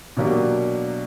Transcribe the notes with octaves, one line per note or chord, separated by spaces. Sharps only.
B2 F#3 A#3 D4 G4